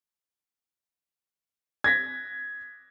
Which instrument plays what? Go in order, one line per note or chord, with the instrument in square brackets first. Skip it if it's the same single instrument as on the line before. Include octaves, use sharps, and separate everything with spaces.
[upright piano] G#6 A#6 B6